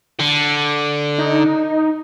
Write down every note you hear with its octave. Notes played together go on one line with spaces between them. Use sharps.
D3
D#4